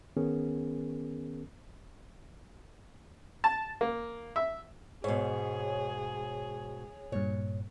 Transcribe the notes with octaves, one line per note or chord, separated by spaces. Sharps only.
D#3 B3 C#4 G#4 A#4
A5
A#3
E5
G#2 B2 G#4 C#5
G2 A#2 C#5